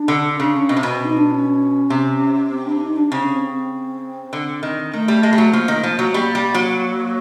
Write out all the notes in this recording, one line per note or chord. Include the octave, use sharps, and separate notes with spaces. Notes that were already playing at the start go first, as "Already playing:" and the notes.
Already playing: D4
D3
C#3 D4
C#4
B2 C4
C3
B2
D#4
D4
C#4
C3
C4
D4
D#4
D4
C#3 C4
C#4
C4
D3
D#3
D#3 A3
G3
G#3
G3
F#3
F3 A#3
D#3
F3
F#3
A3
G3 A#3
G3
F#3